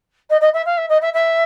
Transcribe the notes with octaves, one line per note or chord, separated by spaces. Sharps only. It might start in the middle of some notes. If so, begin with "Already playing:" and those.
D#5
D#5
E5
F5
E5
D#5
E5
E5